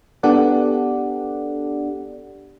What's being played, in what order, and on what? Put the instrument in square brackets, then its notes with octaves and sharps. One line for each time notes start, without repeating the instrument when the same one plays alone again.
[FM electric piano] B3 D4 G4 A4 D5 F#5